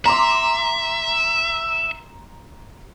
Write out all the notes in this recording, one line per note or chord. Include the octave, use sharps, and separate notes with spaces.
E5 A#5 C6 D6